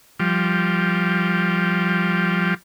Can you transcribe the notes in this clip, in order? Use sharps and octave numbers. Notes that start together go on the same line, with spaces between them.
F3 G3